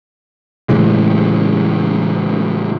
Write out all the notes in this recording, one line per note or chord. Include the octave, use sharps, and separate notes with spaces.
A2 C#3 E3 G#3